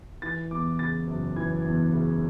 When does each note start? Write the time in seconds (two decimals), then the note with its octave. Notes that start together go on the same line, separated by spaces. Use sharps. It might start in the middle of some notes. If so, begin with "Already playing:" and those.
0.22 E3 A6
0.51 E2 D6
0.79 C#3 A6
1.07 F#1
1.36 E3 G#6
1.65 E2
1.93 C#3